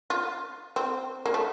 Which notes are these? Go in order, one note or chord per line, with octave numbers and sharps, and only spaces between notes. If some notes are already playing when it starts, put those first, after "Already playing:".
F4
C4
A#3
A3